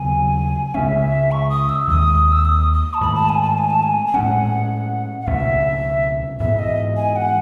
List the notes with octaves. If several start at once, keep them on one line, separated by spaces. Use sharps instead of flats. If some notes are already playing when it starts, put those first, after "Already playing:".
Already playing: D#2 C#3 F#3 B3 G#5
C#2 C#3 G#3 C#4 E5
C#6
D#6
E6
D#2 D#3 G#3 D#6
E6
D#6
D#6
A5
G#2 D#3 A3 B5
A5
G#5
A5
G#5
A5
G#5
G#5
A2 G#3 C#4 F#5
F#5
C#2 B2 A3 C#4 E5
G#2 E3 B3 E5
D#5
G#5
F#5